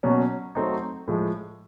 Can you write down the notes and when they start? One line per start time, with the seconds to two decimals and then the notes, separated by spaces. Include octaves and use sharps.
0.03 B2 F#3 A#3 C#4
0.55 F#3 A3 C4 D#4
1.08 A2 F3 G#3